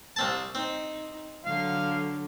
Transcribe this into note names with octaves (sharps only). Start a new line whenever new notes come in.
C2 C4 A5
C4 D#4
D3 F#3 F5